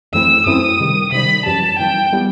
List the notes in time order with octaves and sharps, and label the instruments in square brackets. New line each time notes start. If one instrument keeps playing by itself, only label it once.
[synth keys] F#2 E3 A3 C4 E4 [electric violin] E6
[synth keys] F#2 E3 A3 C4 E4 [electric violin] D#6
[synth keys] C3 D#3 G3
[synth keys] C3 D#3 G3 [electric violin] B5
[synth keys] F#2 E3 G3 [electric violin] A5
[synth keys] F#2 E3 G3 [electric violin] G5
[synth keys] E3 G3 B3